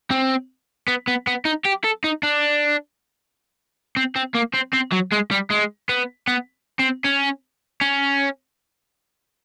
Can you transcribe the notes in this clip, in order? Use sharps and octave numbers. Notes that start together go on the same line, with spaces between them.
C4
B3
B3
B3
D#4
G4
A4
D#4
D4
C4
C4
A#3
C4
C4
F#3
G#3
G3
G#3
B3
B3
C4
C#4
C#4